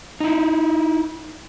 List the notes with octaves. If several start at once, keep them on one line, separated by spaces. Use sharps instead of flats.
D#4 E4